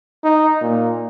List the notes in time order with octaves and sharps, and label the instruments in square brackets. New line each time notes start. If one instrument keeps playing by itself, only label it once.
[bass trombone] D#4
A#2